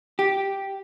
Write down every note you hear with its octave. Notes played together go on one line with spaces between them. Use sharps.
G4